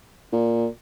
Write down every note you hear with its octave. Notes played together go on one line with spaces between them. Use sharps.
A#2